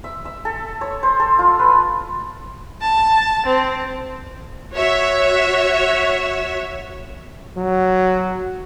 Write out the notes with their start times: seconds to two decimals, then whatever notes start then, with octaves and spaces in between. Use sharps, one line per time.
0.04 E5
0.25 E5
0.45 A4
0.81 C#5
1.03 C5
1.20 A4
1.39 F4
1.59 B4
2.82 A5
3.46 C4
4.73 F#4 C#5 E5
7.57 F#3